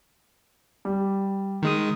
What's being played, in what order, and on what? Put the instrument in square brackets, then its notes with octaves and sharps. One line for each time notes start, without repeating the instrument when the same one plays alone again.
[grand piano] G3
[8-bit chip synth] D#3 G#3 D#6